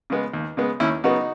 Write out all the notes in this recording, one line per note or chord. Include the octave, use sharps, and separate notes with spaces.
C#3 G#3 B3
D#2
C#3 G#3 B3
D#2 C#4 E4
C#3 F#3 B3 D#4 F#4